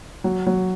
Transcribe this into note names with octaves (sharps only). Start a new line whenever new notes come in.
F#3
F#3